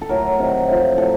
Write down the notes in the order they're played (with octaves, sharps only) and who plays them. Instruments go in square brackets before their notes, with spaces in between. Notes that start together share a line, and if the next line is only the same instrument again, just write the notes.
[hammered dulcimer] A4
A2 F#3 A#4
C3 D#3 F#3
A2 F3
A2 F#3 A4